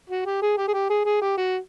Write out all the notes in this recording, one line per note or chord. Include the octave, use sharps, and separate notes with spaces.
F#4
G4
G#4
G4
G#4
G4
G#4
G#4
G4
F#4